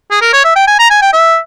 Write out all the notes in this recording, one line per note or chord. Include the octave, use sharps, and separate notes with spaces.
G#4
A#4
C#5
E5
G5
G#5
A#5
G#5
G5
E5